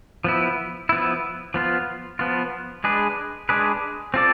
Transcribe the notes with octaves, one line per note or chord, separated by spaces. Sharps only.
F3 B3 E4
F3 B3 E4
F3 B3 F4
F3 B3 F4
G#3 D4 G#4 B4
G#3 D4 G#4 B4
C4 F4 A4 D5